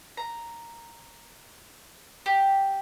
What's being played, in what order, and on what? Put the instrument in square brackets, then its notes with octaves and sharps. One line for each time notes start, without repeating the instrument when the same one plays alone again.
[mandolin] A#5
G4